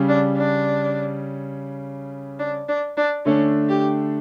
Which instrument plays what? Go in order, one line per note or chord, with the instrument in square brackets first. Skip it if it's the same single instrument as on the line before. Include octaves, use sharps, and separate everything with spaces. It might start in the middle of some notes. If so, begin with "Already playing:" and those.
Already playing: [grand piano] C#3 G3 C#4
[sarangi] D4
D4
D4
D4
D4
[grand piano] D3 A3 D4 [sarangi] C#4
[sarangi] G4